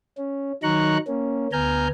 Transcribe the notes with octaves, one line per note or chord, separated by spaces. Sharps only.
C#4
D#3 F#3 D#4 A#5 C#6 F#6
A#3 C#4
D2 B3 G#5 A#5 F6 G6